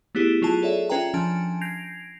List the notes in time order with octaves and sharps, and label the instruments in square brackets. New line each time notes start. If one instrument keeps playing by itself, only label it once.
[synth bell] A3 B3 E4 G4 G#4
F#3 F4 G#4 A5
G#4 A4 C#5 D5 E5
C#4 F4 B4 E5 G5 A#5
F3 C#4 D4 G#5 A5
G6 G#6 A#6 C7 D7 F7